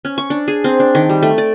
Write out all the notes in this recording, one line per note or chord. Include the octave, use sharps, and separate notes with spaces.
C#4
C#6
D4
G#4
C4
D4
D#3
G3
A3
D5